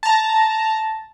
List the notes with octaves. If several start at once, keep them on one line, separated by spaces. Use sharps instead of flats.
A5 A#5